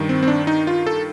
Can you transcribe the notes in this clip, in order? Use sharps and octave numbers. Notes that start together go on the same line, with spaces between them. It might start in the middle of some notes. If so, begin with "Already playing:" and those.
Already playing: G2 D#3
C4
C4
D4
D#4
F4
A4